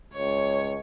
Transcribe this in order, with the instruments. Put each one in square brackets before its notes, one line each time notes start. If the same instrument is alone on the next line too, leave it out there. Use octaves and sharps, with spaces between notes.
[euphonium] C#2 [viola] C#5